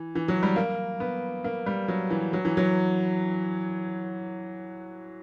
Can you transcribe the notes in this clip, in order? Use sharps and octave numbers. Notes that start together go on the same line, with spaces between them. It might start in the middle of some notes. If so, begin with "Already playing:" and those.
Already playing: E3
E3
F#3
G3
A#3
B3
A#3
G3
F#3
E3
F#3
E3
F#3